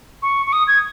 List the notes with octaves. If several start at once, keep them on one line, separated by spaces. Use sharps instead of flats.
C#6
C#6
D#6
G#6